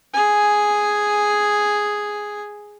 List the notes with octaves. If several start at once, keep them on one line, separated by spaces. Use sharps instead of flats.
G#4 G#5